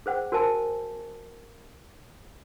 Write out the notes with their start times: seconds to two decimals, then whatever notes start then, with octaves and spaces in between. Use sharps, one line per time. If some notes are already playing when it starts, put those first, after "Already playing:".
0.06 G#4 C5 F#5 G5
0.32 F#4 A#4 C5 G#5 A5